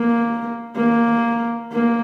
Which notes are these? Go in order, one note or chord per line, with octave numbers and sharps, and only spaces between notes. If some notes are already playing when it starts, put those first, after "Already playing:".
Already playing: A#3
A#3
A#3